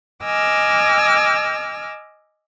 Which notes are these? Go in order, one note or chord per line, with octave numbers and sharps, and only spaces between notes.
D#5 G#5 D6 E6 F6